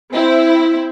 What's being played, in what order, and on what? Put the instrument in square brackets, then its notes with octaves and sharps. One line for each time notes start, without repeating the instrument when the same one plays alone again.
[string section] C4 E4